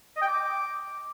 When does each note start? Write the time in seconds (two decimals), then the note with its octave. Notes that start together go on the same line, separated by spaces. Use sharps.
0.17 D#5
0.22 G5
0.27 D6